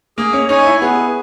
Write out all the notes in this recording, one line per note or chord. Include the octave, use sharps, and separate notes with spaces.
A#3 G#4
C#4
D#4 C#5 G#5
E4
B3 G#4